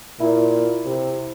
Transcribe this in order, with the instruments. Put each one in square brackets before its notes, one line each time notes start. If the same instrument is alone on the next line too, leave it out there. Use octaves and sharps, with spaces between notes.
[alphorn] A#2 [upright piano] E4
[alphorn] C3